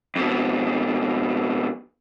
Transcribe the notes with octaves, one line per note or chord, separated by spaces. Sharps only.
F2 B2